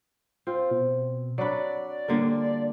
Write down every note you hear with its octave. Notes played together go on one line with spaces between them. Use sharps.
C4 F4
B2
F#3 D4 D5 F#5 B5
D3 G3 A#3 F4 A#4